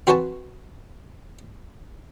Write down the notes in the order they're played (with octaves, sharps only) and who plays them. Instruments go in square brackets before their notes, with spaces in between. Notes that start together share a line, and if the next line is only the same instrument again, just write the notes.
[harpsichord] C4 F#4 B4 C#5 G#5 A5